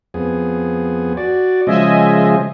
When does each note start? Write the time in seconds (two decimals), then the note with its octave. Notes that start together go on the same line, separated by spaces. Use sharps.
0.14 F2 B3 G#4
1.17 F#4 D5
1.67 C#3 F3 G#3 D#5 E5 G#5